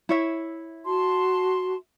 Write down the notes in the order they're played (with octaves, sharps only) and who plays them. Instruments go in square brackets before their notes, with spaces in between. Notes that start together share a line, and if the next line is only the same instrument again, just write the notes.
[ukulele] E4 C#5 E5
[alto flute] F#4 [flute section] A5 C6